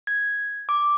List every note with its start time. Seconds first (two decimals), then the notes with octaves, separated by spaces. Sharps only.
0.07 G#6
0.69 D6